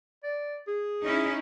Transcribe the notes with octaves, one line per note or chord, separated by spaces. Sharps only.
D5
G#4
C#4 D#4 E4